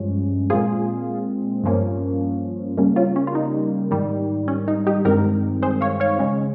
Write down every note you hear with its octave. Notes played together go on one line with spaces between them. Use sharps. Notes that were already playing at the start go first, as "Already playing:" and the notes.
Already playing: G2 F3 G#3 C#4
A#2 G#3 C4 F4 G#4
G2 F3 A#3 C#4
C#3 G3 A#3 C#4
C#4 F4
C#4
F4
D#4
G#2 D#3 G3
C#4
D#4
D#4 G4
G2 D#3 G#3 C4 G4 A#4
G#4 C5
C#5 F5
C#5 F5
C#3 G#3 C#4